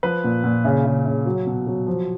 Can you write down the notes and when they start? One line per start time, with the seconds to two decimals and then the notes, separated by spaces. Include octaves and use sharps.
0.03 F3 B4
0.24 A#2
0.44 A#2
0.65 C#3
0.85 C#3
1.05 C#3
1.26 F#3
1.47 B2
1.67 F#3
1.87 F3